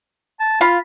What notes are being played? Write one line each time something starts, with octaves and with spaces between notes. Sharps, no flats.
A5
F4 F5 B5